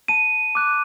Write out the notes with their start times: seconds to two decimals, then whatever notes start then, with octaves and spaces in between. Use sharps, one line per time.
0.08 A5 D#7
0.55 D6 F#6